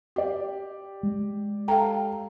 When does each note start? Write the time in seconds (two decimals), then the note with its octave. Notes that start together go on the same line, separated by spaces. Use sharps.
0.16 G4 D5
1.03 G#3
1.68 A4 F5 G5 A#5